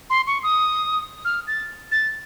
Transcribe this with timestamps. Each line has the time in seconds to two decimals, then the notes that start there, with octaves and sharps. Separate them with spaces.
0.10 C6
0.27 C#6
0.43 D#6
1.25 F6
1.47 A6
1.92 A6